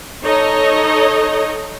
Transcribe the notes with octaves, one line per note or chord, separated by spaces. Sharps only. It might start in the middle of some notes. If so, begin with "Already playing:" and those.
D#4 A4 C#5 D#5